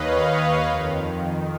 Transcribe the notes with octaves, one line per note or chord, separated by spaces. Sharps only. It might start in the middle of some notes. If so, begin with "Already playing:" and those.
Already playing: D#2 D#3 B4 C#5 D#5 F5
F2 D#3